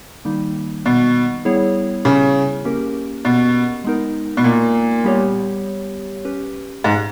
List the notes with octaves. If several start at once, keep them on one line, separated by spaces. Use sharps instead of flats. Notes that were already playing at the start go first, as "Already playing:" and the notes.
D#3 G3 A#3 D#4
B2
G3 B3 E4 G#4 C#5
C#3
A#3 C#4 G4 A#4
B2
G#3 B3 D#4 A#4
B2
A#2
G3 B3 G4 C#5
C#4 G4 B4
G#2